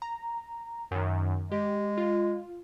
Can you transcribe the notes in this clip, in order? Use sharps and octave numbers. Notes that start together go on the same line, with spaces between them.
A#5
F#2 D#3
G#3 G4
F4